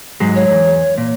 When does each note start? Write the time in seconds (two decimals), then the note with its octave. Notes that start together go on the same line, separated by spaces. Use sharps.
0.20 G#2 F#3 G#3
0.35 C#5
0.51 E2
0.98 A#2